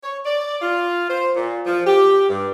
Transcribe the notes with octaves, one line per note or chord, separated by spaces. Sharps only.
C#5
D5
F4
C5
A#2
F3
G4
G2